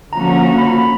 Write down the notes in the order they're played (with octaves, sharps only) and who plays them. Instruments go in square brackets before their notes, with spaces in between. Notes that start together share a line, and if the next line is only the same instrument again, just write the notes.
[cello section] D3 F3 A#3 C#4 F#4 [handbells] A#5
[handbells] A#5
A#5
A#5
B5
A#5
B5